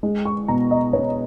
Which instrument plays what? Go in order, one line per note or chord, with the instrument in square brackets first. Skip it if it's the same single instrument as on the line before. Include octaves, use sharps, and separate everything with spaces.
[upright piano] G#3
C#6
B2 A#5
D#5
B3 C#5